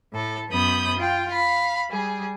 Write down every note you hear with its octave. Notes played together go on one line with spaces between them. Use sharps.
A2 A4
F#2 B3 B5 D#6 G6
F4 G5
F5 B5
G3 G#4